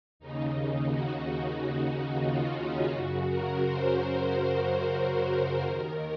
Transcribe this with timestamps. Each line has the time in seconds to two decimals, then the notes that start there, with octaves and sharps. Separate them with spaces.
0.19 D#2 C#3 D#4
0.54 D#4
0.88 F#4
1.22 F#4
1.56 F#4
2.24 F4
2.58 C#4
2.92 F#2 C#3 F#4
3.27 A#4
3.60 C5
4.97 C5
5.30 C5
5.64 D#2 D#3 A#4